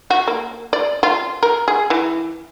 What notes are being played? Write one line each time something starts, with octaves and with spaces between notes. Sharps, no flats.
F#4
A#3
D5
F4
A#4
G#4
E3